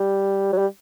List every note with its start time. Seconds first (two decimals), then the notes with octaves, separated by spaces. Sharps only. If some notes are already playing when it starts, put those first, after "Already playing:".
Already playing: G3
0.52 F#3
0.58 G3